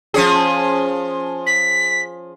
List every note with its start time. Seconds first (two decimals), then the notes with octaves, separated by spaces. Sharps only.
0.14 F3 C#4 G#4
1.46 B6